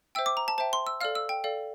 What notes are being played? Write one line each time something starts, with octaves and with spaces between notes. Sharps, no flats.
C5 E5 G5 E6
D6
A#5
A5
C5 E5 G5 A5
C6
E6
A4 D5 F5 F6
E6
G5
A4 D5 F5